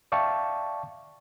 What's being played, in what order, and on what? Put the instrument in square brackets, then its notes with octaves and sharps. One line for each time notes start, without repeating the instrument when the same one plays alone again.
[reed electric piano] D5 E5 F5 G5 A5 C#6